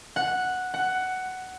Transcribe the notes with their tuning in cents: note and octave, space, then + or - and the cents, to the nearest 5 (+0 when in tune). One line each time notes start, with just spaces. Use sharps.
F#5 -5
F#5 +10